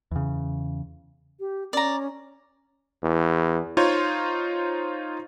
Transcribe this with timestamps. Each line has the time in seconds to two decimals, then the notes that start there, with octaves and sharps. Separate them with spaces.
0.11 E2 C#3
1.40 G4
1.73 C#4 D5 A#5
3.03 E2
3.77 D#4 F4 C5 C#5